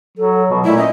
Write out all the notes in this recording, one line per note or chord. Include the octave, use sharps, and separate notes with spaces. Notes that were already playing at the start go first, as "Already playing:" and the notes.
F#3 A4
B2 F#3
A#2 A3 E4
C#4 D#5